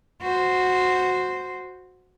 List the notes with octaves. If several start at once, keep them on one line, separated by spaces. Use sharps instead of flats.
F#4 C5